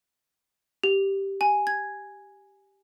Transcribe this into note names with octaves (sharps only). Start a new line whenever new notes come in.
G4
G#5
G#6